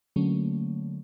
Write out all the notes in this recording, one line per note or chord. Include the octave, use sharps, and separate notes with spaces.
D3 F#3 A3 A#3 C#4